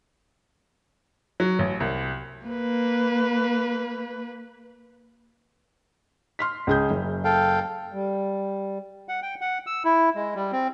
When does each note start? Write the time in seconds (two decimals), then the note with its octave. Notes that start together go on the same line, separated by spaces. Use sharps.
1.40 F#3
1.59 A1
1.80 C2
2.46 A#3 B4
6.39 C6 F6 B6
6.67 C#2 G#4 G6
6.91 F#1
7.24 A4 F5 G5
7.92 G3
9.09 F#5
9.22 G5
9.41 F#5
9.66 E6
9.85 E4
10.15 G#3
10.35 G3
10.52 C4